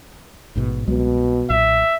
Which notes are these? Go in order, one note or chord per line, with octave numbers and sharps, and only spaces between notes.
A1 G#2 B2
C2 B2 F#3 G#3
B1 A#2 E5